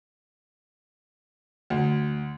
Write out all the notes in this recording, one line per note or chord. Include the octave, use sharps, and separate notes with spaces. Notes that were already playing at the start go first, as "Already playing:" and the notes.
D2